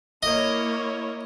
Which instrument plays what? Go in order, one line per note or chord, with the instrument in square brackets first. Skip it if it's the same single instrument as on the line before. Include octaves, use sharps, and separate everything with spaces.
[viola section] A#3 E4 C#5 [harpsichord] D#5